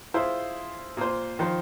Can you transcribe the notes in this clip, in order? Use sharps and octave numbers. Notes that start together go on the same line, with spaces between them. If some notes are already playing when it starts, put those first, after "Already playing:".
E4 F4 G#4 C5
A#2 C5
D#3 F3 C5